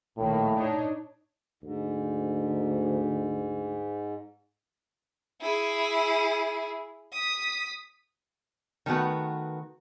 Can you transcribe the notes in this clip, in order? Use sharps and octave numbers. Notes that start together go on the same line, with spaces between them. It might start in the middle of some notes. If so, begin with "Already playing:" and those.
A#1 A2 D#3 A#3
D4 D#4 C#5
D2 G#2
E4 G#4
D#6 B6
D#3 A3 B3 F#4 B4